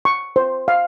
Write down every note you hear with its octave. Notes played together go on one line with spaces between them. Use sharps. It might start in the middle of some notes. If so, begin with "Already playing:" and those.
C#6
C5
F5